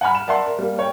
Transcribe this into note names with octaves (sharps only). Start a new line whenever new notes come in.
F#5 G#5 A#5 B5 F6
E7
A#4 D5 E5 F#5 A5 C6
A#4
G3 A#3
C#5 G5